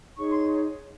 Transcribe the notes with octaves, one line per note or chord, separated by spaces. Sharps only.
D#4 G#4 C#5 C#6
C6